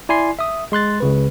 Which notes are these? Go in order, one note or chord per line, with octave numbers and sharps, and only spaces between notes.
E4 D5 G#5 C6 C7
E5 D#6
G#3 C6 F#6 A6
C#2 C#3 B4